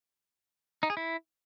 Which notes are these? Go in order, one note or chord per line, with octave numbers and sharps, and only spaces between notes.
D#4
G#4
E4